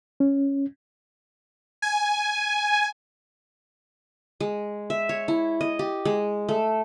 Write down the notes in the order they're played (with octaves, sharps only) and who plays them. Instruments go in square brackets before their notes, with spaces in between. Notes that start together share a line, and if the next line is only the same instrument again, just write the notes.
[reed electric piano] C#4
[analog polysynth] G#5
[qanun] G#3
E5
C#5
E4
D#5
G4
G#3
A3